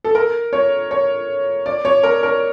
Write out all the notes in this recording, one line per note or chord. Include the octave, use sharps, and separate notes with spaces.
A4
A#4
C#5
C#5
D5
C#5
A#4
A#4